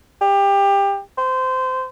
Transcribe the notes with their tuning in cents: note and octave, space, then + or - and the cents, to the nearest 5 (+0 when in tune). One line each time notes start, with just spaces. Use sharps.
G4 +25
C5 -20